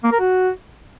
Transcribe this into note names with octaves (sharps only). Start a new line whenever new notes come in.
A#3
A#4
F#4